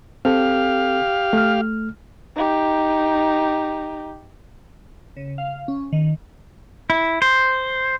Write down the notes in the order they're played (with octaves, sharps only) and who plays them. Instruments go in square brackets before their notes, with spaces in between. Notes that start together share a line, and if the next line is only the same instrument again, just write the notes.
[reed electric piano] C4 A4 [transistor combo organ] G4 F5
[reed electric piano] A3 F6
[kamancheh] D#4 G4
[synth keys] C#3
F5
C#4
D#3
[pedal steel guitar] E4
C5